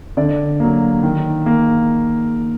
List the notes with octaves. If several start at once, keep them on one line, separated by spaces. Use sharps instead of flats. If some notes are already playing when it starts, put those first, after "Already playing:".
D3 D5
F#3 A#3
D#3
A#3